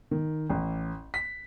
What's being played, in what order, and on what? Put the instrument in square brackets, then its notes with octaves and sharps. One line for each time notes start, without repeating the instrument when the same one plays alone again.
[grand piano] D#3
A1
B6